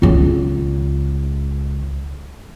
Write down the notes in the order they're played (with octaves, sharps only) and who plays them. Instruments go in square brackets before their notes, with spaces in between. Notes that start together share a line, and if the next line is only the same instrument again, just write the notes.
[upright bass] C#2 C#3